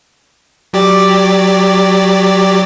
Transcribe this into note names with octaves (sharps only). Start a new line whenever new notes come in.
F#3 G4 D5